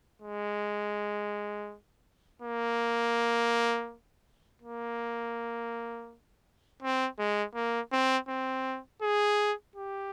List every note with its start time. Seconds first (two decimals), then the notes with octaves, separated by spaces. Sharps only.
0.22 G#3
2.42 A#3
4.62 A#3
6.82 C4
7.19 G#3
7.55 A#3
7.92 C4
8.28 C4
9.02 G#4
9.76 G4